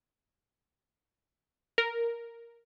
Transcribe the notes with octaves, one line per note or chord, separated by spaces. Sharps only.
A#4